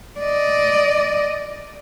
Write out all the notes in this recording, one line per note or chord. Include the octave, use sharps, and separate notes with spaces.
D5 D#5